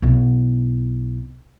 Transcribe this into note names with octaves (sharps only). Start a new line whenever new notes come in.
B1 E4